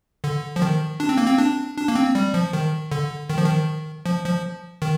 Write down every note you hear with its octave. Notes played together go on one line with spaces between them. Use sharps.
D3
F3
D#3
D4
C4
A#3
C4
D4
D4
A#3
C4
G3
F3
D#3
D3
D#3
F3
D#3
F3
F3
D#3